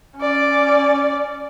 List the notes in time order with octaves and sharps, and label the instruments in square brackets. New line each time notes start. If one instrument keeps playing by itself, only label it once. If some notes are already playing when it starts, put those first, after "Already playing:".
[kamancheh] C#4 D5